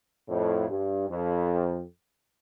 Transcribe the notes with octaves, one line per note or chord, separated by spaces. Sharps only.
F2 A2
G2
F2